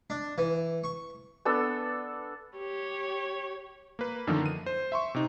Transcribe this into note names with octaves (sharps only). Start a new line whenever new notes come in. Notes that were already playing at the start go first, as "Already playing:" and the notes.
D4
E3
C#6
B3 D4 A4 E6
G4 C#5
A#3 B4
F#2 D3 D#3 F3 A#3
D#7
C5
E5 C6 C#6
C3 D#4